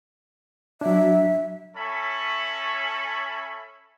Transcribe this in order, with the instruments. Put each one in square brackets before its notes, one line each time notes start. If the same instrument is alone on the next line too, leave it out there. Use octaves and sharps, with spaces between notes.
[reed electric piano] F#3 D4 [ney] E5
[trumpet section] C#4 A4 C#5 E5 B5 C#6